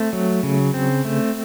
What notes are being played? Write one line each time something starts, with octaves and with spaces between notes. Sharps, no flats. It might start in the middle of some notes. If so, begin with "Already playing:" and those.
Already playing: A3 C4
F#3
C#3
C4
A3